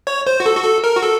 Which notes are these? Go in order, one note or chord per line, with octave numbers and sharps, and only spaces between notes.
C#5
C5
F#4
A4
F#4
A4
A#4
F#4
A4